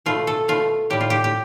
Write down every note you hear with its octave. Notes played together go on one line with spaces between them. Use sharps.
B2 A3 F4
A4
B2 A3 F4
A2 G3 G4
F4
G4
G4